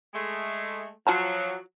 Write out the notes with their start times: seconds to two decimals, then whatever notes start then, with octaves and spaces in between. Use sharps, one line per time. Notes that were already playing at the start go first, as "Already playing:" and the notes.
0.14 G#3 A3
1.07 F3 F#3 F4 A5 A#5